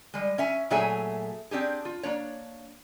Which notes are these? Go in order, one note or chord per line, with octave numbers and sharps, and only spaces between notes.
G3 G#3
C#4 E5 G#5
A#2 F#3 A3 G#4 E5 G#5
C4 D4 G4 G#4
F4
A#3 D4 C#5